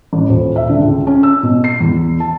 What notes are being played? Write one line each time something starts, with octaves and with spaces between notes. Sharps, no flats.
A1
D#1
E5
D3
C#2
C#4
E6
B2
C7
E2
A5